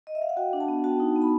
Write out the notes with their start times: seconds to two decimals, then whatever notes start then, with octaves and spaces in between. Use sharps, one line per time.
0.07 D#5
0.15 E5
0.22 F5
0.29 F#5
0.37 F#4 G5
0.53 D4
0.60 A5
0.68 B3
0.84 F#4 A5
1.00 D#4
1.16 B3
1.22 B5